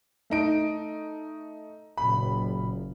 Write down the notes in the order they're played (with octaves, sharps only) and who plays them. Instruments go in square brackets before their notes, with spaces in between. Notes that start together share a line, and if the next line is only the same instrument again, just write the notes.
[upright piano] A3 D#4 D7
[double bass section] F#1 A#2 [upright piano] B5